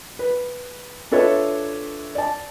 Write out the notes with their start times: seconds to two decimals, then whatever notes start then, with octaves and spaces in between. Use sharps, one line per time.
0.19 B4
1.11 D4 F4 A4 B4 C#5 E5
2.15 D5 A5